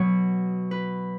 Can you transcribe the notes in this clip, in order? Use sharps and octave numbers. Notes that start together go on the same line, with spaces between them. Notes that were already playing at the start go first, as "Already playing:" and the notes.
Already playing: B2 F#3 C#5
B4